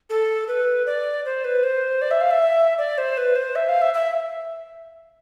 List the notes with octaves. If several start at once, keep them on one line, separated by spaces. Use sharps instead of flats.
A4
B4
D5
C5
B4
C5
D5
E5
F5
E5
D5
C5
B4
C5
E5
F5
E5
E5